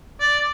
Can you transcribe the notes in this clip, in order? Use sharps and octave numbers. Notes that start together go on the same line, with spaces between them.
D5